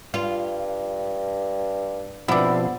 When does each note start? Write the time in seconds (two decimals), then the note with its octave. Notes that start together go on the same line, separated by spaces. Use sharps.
0.14 G2 F4
2.28 G2 B2 F3 B3 C4 D4 E4